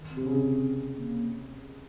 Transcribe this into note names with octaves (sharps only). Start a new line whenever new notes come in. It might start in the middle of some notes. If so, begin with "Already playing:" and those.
Already playing: D#3
C4
C3
C#3
A#3